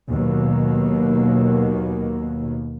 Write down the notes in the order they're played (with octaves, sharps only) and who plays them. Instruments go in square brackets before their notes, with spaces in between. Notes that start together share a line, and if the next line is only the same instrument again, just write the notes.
[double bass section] D#2 B2 D#3 F#3 A#3